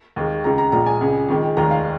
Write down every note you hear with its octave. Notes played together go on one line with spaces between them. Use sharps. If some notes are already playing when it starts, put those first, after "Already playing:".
D#2 D#3 G#3
C#2 C#3 G#3 A#5
A#5
A#1 A#2 G#3 A#5
G#5
C#2 C#3 G#3
F2 D#3 G#3
F1 D#2 D#3 G#3 A#5
F5